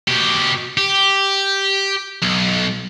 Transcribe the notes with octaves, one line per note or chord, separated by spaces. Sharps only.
B2 G4
G4
B1